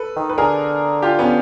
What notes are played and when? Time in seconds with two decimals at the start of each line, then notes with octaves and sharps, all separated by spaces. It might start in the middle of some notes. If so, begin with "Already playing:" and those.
Already playing: A4 B4
0.16 D#3
0.30 B4
0.38 D3 G#4 A#4
1.02 F4 G4
1.19 B3 C#4